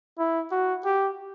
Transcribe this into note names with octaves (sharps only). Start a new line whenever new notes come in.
E4
F#4
G4